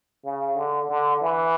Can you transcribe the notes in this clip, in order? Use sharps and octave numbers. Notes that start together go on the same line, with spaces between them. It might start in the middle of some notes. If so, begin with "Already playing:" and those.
C#3
D3
D3
E3